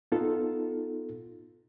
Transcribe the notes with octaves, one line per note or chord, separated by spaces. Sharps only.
B3 D#4 F4 A4